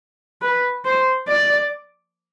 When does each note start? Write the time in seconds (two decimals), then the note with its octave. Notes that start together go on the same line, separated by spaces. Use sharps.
0.42 B4
0.85 C5
1.28 D5